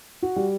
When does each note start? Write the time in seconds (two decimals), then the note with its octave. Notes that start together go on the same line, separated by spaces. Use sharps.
0.22 F#4
0.36 G3